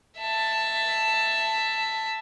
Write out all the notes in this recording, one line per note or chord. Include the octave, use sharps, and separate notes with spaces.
E5 A5